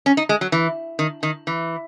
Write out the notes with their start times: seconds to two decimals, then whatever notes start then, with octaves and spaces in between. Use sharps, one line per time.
0.06 C#4
0.17 D#4
0.29 G#3
0.41 F#3
0.52 E3
0.99 D#3
1.23 D#3
1.47 E3